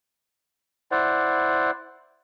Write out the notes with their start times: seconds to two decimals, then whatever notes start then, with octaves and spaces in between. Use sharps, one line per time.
0.91 E4 C5 D5 F#5